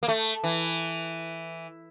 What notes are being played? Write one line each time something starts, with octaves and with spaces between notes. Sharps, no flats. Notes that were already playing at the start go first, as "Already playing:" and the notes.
A#3
A3
E3